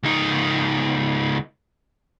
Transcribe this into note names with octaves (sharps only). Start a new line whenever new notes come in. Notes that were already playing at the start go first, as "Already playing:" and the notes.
C#2 D#4